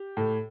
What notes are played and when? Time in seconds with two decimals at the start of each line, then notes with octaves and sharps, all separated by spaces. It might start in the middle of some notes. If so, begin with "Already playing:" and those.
Already playing: G4
0.17 A2